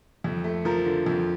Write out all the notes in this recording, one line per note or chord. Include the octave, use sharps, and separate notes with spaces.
F2
A3
F3 A#4
D3
F2